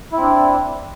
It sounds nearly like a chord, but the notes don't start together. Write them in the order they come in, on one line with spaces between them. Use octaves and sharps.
E4 C4 D4